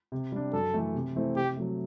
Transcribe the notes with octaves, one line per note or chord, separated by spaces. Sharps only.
C3
G3 D4
F#2 A4
E3 A3
C3
E3 A3 C4 E4
C3 G4
F#3 A3